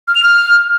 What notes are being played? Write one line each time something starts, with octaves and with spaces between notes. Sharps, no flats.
F6
F7
F6